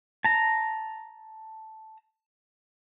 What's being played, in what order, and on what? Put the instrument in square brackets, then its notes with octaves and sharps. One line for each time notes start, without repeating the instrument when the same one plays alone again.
[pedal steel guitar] A5 A#5